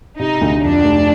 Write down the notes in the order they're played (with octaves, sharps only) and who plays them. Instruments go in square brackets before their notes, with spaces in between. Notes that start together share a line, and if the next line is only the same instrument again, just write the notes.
[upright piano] C3 [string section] D#4
[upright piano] D2
[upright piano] F2 [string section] D4
[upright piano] F1